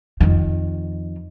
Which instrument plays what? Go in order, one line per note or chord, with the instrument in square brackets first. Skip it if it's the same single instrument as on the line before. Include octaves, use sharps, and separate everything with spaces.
[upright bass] F2 D#3